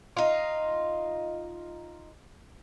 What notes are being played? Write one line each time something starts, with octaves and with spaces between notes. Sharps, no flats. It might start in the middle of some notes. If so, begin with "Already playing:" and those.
D#4 F4